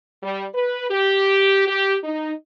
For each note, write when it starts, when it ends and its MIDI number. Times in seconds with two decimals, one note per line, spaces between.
0.23 0.45 55
0.54 0.89 71
0.90 1.68 67
1.68 1.96 67
2.03 2.31 63